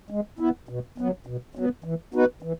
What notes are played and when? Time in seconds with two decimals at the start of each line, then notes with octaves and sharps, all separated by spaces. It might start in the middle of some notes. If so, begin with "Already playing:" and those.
0.10 G#3
0.39 B3 E4
0.69 B2
0.98 F#3 B3
1.27 B2
1.55 F#3 B3
1.84 E3
2.14 B3 D#4 F#4 B4
2.43 E3